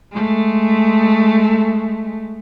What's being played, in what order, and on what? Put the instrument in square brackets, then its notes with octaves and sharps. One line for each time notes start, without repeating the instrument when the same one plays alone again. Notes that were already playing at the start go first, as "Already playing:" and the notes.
[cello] G#3 A3